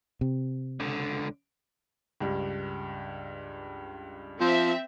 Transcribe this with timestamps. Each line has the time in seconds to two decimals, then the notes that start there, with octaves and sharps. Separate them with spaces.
0.21 C3
0.80 C#2 D3
2.21 C#2 G2 G3
4.41 F3 C4 E5